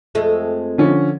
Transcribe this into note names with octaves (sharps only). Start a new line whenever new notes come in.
F2 G#3 A3
D3 F3 C#4